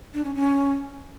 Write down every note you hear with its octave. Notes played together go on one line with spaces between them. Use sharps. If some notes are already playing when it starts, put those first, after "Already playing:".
D4
C#4
C#4